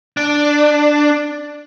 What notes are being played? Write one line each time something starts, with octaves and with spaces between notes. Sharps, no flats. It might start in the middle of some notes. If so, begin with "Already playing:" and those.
D4